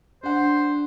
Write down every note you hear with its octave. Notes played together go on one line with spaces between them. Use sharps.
D4 C5 F#5